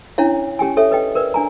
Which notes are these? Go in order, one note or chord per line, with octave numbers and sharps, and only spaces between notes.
C#4 D4 E4 C#5 F5
C#4 G4 G5 G#5
A4 C#5 E5
B4 D#5 G5
A#4 B4 D5
D4 G#5 A#5